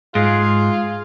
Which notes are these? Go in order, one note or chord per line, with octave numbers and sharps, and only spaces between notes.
G#2 F4 G#4